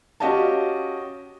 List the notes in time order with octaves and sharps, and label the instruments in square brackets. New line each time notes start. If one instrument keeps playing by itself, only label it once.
[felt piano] C#4 F#4 G4 D#5 F5 A5